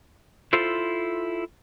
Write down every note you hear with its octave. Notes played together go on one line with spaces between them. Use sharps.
E4 F4 A4 C5